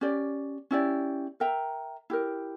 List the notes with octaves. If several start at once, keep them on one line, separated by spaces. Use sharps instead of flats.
C#4 G4 D5
C#4 E4 G4 D5
A#4 E5 G5 A#5
E4 G4 A#4